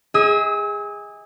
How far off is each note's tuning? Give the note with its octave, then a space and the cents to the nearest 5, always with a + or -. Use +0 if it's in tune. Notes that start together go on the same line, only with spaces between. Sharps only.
G#4 -20 D#5 +35 E6 -40